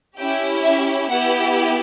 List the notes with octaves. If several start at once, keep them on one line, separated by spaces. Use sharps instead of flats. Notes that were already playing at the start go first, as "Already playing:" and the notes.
C#4 E4 G4 G5
E5
B3 E4 G4 F#5